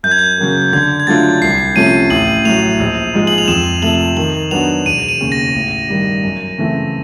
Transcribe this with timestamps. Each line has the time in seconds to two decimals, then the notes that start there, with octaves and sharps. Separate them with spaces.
0.03 F#2 G6
0.11 G#6
0.19 G6
0.38 C#3 F#3 A#3
0.73 D3 G#6
1.00 G#6
1.07 F#3 A3 D4 F4 A6
1.41 C2 C7
1.76 C3 F3 A3 C#4 D#7
2.10 A1 F#7
2.45 A2 F#3 F7
2.79 A#1
3.14 G#2 F3 G#3
3.27 F#7
3.38 F7
3.48 F2 E7
3.82 C3 F3 A3 F#7
4.17 D#3 F#7
4.51 F#3 B3 D4 F#4 F7
4.86 E1 D#7
5.09 D#7
5.20 D#2 C#3
5.32 A#6
5.55 A1
5.88 G2 D#3 G3
6.23 F#2
6.58 C#3 E3 A3 C4